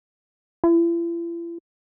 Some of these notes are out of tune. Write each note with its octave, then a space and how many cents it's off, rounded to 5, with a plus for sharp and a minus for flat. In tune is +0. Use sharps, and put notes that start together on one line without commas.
E4 +45